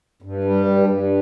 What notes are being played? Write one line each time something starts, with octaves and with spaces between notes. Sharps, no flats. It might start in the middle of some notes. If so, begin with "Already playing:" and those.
G2
G3
G2
G2